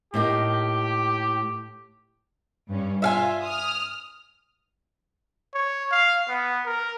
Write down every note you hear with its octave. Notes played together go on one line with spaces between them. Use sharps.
A2 A#3 D#4 G4
G2 C#4
F4 E5 F5 G#5
D#6 F6
C#5
F5
B3
A#4